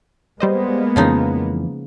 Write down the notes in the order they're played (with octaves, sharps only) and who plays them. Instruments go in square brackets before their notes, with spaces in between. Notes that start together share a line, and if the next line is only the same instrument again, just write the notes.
[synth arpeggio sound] G3 C5 D#5 [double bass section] G#3 A#3 B3
[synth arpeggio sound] F2 E3 [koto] C#3 F3 D#4